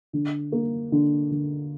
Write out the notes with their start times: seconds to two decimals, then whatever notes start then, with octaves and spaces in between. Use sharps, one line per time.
0.13 D3
0.52 A#3
0.92 D3
1.31 D3